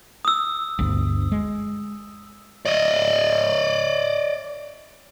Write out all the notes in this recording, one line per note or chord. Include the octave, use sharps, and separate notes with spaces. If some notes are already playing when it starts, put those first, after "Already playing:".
D#6 E6
G1 D2
G#3
D5 D#5